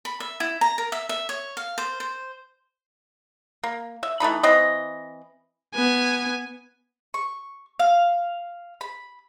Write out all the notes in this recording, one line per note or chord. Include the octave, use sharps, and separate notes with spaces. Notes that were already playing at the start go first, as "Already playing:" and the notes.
B5
E5
E4
A#5
A#4
E5
E5
C#5
F5
C5
C5
A#3
E5
E3 A3 D#4 B5
E3 C4 D#5
B3 G#5
C#6
F5
B5